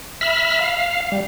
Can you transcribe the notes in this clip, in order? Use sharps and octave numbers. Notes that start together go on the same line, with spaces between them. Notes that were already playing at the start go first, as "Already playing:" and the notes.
E5 B5 F6
F5
G3